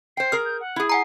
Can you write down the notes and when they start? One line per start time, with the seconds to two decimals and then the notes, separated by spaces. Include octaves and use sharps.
0.17 C5 G5 C7
0.32 G#4 A#4 F6
0.45 G6
0.60 F#5
0.76 E4 G#4
0.90 F#5 G#5 A#5 C7